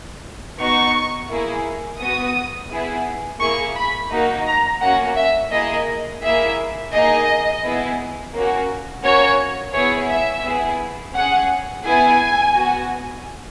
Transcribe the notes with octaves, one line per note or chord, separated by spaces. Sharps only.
B3 D#4 F#4 C#6
A#3 E4 G#4
B3 F#4 D#6
B3 E4 G#4
A#3 E4 G#4 C#6
B5
A#3 D#4 F#4
A#5
A#3 C#4 F#4 F#5
E5
A#3 E4 G#4 D#5
A#3 E4 G#4 E5
A#3 D#4 G#4 D#5
B3 E4 G#4
A#3 C#4 F#4
A#3 C#4 F#4 C#5
B3 E4 G#4 C#5
E5
B3 E4 G#4
C#4 G#4 F#5
B3 E4 G#4 G#5
B3 F#4